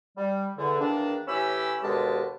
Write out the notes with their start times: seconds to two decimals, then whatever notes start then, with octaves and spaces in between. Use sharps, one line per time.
0.16 G3
0.57 E2 D3
0.80 E2 D#3 A#3 D4
1.28 A2 E3 C#4 G4 B5 E6
1.82 D#2 B2 D3 G#3 G4 A5